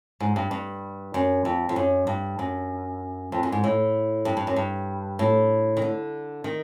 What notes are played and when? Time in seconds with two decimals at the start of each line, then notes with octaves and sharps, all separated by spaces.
0.20 G#2
0.36 G2
0.51 G2
1.14 F#2
1.45 F2
1.69 F2
1.76 F#2
2.07 G2
2.39 F#2
3.32 F2
3.43 F#2
3.52 G#2
3.64 A2
4.25 G2
4.37 G2
4.47 F#2
4.56 G2
5.19 A2
5.77 D#3
5.82 D3
6.44 D#3